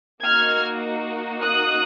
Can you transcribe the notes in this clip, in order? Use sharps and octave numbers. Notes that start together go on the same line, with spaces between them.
A#3 D#4 F#4 F6 G#6
D#6 F#6